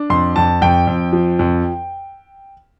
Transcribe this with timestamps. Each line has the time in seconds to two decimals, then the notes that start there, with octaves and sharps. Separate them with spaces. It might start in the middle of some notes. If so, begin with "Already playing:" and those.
Already playing: D4
0.10 F2 C6
0.36 F2 A5
0.62 F2 G5
0.87 F2
1.13 F3
1.39 F2